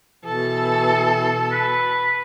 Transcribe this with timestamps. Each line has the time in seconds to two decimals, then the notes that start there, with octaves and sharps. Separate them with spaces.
0.25 B2 E3 A4
1.52 B4